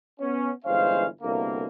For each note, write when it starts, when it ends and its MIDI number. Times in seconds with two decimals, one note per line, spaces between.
0.20 0.50 59
0.20 0.50 61
0.65 1.06 31
0.65 1.06 52
0.65 1.06 56
0.65 1.06 61
0.65 1.06 72
0.65 1.06 77
1.22 1.67 36
1.22 1.67 47
1.22 1.67 50
1.22 1.67 58